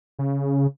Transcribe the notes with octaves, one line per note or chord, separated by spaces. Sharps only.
C#3